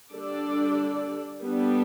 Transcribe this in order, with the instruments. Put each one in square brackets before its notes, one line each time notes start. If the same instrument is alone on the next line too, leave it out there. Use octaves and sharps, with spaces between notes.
[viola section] D3 G3 D4 A4 D5
G3 B3 D4 A4